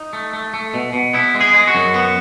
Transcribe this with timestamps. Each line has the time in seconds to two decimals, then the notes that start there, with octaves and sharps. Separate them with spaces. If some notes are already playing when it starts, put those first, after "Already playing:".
Already playing: D#4
0.13 A3
0.33 A3
0.54 A3
0.74 B2
0.93 B2
1.13 B3 E4
1.34 G#3
1.41 G#4
1.54 G#3
1.67 F#4
1.75 F#2
1.94 B3